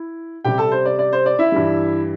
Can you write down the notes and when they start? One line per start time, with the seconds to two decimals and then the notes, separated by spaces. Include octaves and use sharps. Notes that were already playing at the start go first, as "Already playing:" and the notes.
Already playing: E4
0.45 C3 G3 G4 G5
0.58 A4 A5
0.71 C5
0.86 D5
0.99 D5
1.13 C5
1.26 D5
1.39 E4 E5
1.52 G2 E3 G3